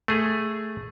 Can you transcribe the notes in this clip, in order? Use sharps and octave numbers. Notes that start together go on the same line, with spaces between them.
A3 G#4